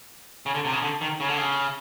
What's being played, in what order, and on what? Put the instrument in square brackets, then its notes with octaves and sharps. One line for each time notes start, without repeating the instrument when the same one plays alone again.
[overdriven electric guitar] C#3
D3
C3
C#3
D3
D#3
C#3
D3
C#3